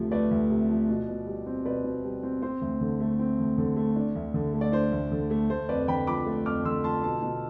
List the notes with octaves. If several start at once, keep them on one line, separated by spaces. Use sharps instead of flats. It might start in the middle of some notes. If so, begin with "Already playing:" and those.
Already playing: D2 C3 F3 A3
A3 B4 D5
D2
C3
F3
B2
B2
G3
C4
B2 B4 D5
B2
G3
C4
C4 C5
D2
D3
A3
C4
D2
D3
A3
D4
D2
D3
A3
D5
D4 C5
D2
D3
A3
A3 C5
F2 B4 D5
D3 G5 B5
F3 B5 D6
A3
F2 D6 F6
D3 C6 E6
F3 A5 C6
B2 A5 C6
B2